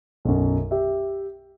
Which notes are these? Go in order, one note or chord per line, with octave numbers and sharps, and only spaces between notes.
B1 F#2
G4 E5